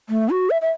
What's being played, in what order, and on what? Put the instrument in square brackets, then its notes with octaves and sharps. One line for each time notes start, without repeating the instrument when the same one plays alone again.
[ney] A3
F#4
E5
E5